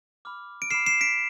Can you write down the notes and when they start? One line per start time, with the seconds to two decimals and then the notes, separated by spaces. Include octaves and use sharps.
0.25 B5 D6 F6
0.62 D7
0.71 B5 D6 F6 C7 E7
0.86 C7 E7
1.01 B6 D7